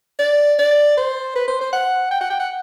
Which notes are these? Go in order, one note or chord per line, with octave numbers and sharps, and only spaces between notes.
D5
D5
C5
B4
C5
C5
F#5
G5
F#5
G5
F#5